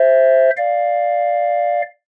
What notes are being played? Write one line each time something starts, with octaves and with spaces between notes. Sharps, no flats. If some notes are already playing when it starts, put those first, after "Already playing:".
Already playing: C5 E5
D5 F5